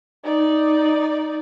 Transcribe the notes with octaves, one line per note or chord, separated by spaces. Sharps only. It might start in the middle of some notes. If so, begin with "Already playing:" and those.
D#4 D5